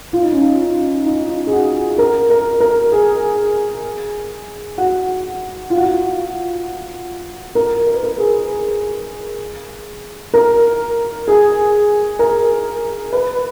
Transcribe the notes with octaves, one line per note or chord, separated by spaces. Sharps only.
F4
D#4
C#4
D#4
D#4
F4
G#4
F#4
A#4
A#4
A#4
G#4
F#4
F4
F#4
F4
A#4
A#4
B4
A#4
G#4
A#4
G#4
A#4
B4